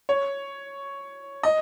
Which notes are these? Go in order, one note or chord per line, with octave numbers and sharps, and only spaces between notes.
C#5
D#5